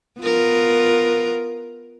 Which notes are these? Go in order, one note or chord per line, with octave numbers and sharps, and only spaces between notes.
B3 F4 A#4